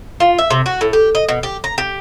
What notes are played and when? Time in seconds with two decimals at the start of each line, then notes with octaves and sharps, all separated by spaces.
0.20 F4
0.38 E5
0.50 C3
0.66 F#4
0.81 A2
0.93 G4
1.15 D#5
1.29 B2
1.43 G4
1.64 A#5
1.78 G4